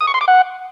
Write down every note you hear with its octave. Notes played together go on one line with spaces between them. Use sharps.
D#6
C#6
C6
D6
F#5